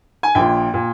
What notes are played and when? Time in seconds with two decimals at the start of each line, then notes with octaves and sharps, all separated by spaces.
0.23 G#5
0.35 A#1 A#2 G5
0.73 A#2